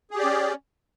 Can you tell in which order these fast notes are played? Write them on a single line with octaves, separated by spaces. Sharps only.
G#4 G4 D5 C#4